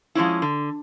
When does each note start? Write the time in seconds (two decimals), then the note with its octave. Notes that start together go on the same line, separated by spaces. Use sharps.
0.15 F3 G#3 C#4 E4
0.42 D3